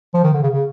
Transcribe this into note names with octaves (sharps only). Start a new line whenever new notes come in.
F3
D#3
D3
C#3
C#3